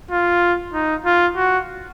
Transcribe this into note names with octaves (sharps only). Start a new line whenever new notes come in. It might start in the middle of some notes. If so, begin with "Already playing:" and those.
F4
D#4
F4
F#4